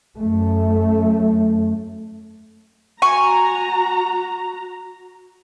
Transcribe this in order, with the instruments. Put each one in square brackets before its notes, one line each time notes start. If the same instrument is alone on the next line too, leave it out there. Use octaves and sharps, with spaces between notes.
[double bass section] F#2 A3
[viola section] F#4 A#5 [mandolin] G#5 C#6